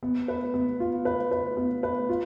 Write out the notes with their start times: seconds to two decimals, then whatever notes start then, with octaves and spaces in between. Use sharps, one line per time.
0.03 B3
0.28 B4
0.54 B3
0.80 F4
1.05 B4
1.31 B4
1.57 B3
1.83 B4
2.09 F4